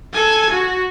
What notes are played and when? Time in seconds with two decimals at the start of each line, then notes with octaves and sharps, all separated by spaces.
0.13 A4 G#5
0.50 F#4